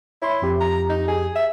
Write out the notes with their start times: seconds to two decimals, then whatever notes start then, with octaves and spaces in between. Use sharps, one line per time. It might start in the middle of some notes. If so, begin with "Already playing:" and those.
0.22 E4 C#5 B5 C6
0.42 F2 G4
0.61 A#5
0.89 D#4
1.08 G#4
1.36 E5